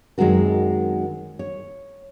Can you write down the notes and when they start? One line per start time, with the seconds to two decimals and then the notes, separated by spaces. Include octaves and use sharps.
0.18 F#2 D#3 G#3 C4 F#4 A#4
1.39 C#5